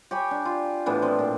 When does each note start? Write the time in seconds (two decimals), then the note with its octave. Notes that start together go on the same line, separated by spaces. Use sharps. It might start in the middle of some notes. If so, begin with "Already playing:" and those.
0.11 G4 C#5 G#5 B5
0.31 D4
0.45 F4
0.86 A2 E3 B3 D4
1.02 F3 C4
1.19 A#2